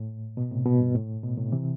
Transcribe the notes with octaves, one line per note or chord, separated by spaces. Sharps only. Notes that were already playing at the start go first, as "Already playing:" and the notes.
Already playing: A2
B2
A2 C3
B2
G2
A2
B2
A2 C3
C3 E3